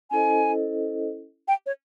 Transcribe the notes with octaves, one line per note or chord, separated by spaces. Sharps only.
C#4 E4 A4 C5 D#5 G#5
G5
C#5